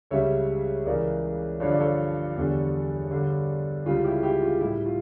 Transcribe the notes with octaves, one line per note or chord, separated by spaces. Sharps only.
C#2 C#3 G3 C#5 E5
C#2 C#3 E3 A#4 D5
G2 D3 F3 C#5
D5
A4 C#5
E2 D3 G3
G2 D3 G3
C#2 C#3 G3 F4
E4 G4
E4 G4
F4
A2 G3 E4
F4